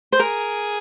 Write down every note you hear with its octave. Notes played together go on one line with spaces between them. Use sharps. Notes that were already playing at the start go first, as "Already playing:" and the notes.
C5
G#4 A#4